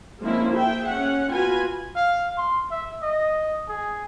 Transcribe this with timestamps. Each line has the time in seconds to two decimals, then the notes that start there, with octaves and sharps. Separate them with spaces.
0.21 F3 G#3 A#3 C4 C#4 E4
0.53 G#4 E5 G5
0.87 C#4 F#5
1.30 B3 F4 F#4 B4 G#5
1.96 F5
2.37 C6
2.71 E5
3.03 D#5
3.68 G#4